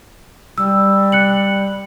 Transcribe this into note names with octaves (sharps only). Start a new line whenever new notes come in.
G3 E6
F#6 C#7 F#7